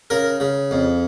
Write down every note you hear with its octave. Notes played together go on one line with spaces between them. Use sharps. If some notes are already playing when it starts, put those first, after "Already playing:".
C#3 A#4
C#3
F2